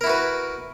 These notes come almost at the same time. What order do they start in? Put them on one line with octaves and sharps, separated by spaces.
A#4 E4 F#4 B4